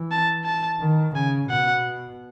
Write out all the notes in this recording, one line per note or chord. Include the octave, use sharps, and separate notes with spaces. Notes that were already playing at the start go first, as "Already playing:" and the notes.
Already playing: E3
A5
A5
D#3
C#3 G#5
B2 F#5